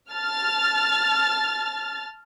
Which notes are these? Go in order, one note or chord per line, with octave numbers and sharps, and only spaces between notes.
A5 F6 A6